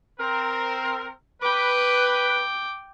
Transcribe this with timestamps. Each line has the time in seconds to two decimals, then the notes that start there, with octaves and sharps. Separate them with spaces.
0.20 C4 A#4
1.42 B4 G5 D6